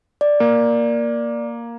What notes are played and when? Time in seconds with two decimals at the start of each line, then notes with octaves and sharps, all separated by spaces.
0.21 D5
0.40 A#3